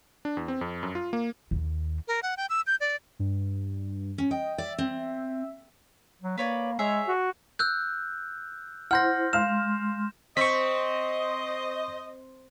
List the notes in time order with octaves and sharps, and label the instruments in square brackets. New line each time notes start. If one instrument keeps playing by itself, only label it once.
[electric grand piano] D4
E2
C4
F2
F#2
F4
A#3
[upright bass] D#2
[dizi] A#4
F#5
G5
E6
G6
D5
[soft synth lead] G2
[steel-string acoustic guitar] C#4
[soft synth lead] D#5 [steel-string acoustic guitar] G5
[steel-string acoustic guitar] D5 [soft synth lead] E5
[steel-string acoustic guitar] C4
[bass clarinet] F#3
[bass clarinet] A#3 [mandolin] B4 C#5 D5
[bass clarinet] G#3 [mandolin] G#4 C#5 E5
[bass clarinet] F#4
[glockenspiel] E6 F#6 G6
[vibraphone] E4 C5 [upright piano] F#5 C6 [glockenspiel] F6 G6 A#6
[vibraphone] G#3 C6 [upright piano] F5 F6 [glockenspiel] E7
[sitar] C4 [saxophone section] C5 D#5 [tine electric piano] C#6 B6